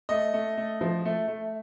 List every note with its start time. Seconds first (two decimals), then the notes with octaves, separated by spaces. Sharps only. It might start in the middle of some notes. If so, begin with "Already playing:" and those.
0.09 A3 D#5
0.34 A3
0.57 A3
0.81 F3
1.05 A3
1.28 A3